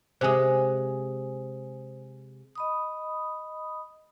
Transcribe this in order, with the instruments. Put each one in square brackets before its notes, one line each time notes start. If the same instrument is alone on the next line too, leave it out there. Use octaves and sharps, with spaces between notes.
[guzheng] C3 G#3 [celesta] C5 G#5 D#6
[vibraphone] D#5 B5 D#6